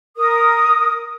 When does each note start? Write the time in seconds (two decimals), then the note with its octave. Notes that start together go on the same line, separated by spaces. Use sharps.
0.17 A#4 D#6